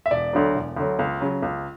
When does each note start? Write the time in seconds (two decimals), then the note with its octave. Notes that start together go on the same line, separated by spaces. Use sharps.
0.06 E5
0.11 E1 D5
0.33 D2 D3 F#3
0.55 E1
0.77 D2 D3 F#3
0.99 C#2
1.21 C#3 F#3
1.42 C#2